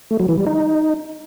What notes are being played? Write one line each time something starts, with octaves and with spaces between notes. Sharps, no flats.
A3
F#3
E3
G3
D#4